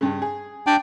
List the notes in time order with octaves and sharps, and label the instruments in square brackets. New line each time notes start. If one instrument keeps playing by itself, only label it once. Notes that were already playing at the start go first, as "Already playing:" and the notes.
[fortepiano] G2 C#3
G#4
[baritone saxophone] D4 [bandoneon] G5